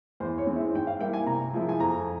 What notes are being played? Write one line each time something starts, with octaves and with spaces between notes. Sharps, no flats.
E2 C5
C#5
E3 G#3 C4
E5
G#2 G5
F5
G3 A#3 E4 G5
G#5
C3 A#5
F3 G#3 E4
G#5
F2 A#5